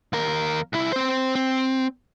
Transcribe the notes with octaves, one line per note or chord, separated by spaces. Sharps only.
D#2 A#4
C2 E4
C4 C5
C4